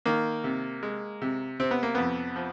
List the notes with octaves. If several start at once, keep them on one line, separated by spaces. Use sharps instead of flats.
D#3 A#3
C3
G#3
C3
C3 C4
B3
A#3
F2 B3
F3